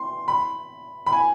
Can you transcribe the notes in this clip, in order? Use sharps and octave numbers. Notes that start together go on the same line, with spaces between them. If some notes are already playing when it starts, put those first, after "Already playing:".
Already playing: C6
B5
B5
G#5